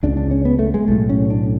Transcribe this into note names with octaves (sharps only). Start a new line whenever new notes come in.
C#2 C#3 D4
D4
C#4
B3
A3
G#3
B1 A2 A3
C#4
D4